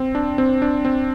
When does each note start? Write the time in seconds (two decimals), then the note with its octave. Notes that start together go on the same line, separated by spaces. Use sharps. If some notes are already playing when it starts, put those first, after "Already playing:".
Already playing: C4
0.15 D4
0.38 C4
0.62 D4
0.85 C4